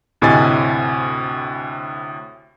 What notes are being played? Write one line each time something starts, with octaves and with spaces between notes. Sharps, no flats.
D2 A2 C3 D#5 G#5 A6